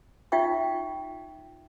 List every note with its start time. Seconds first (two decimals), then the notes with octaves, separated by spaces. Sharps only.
0.32 D#4 F4 E5 G5 C#6